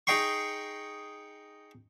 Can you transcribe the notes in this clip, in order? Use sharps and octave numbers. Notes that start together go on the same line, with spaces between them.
D#4 G#4 D#5 G5 C6 C#6